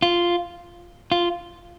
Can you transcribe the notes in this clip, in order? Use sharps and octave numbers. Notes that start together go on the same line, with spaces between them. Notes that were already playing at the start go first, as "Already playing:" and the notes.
F4
F4